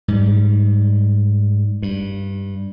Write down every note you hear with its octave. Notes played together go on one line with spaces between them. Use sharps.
G#2 G3
G2